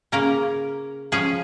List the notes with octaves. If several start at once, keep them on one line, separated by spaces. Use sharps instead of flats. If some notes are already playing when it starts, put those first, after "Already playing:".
C#3 A#3 C#4 A#4
C#3 F3 C#4 G#4